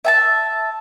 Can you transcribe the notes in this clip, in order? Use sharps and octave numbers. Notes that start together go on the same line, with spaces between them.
E5 G#5 A5